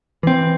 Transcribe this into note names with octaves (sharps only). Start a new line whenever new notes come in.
E3 C4